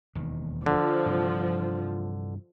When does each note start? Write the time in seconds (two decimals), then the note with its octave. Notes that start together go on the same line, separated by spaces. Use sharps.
0.15 E1 D#2 D#3
0.66 D3 F3
1.06 G2 C3 E3